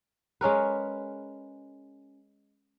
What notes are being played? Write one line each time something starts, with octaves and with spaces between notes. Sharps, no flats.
G#3 C#4 A#4 B4